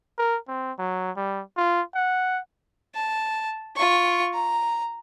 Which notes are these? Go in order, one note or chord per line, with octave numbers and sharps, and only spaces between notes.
A#4
C4
F#3
G3
F4
F#5
A5
F4 C#6
A#5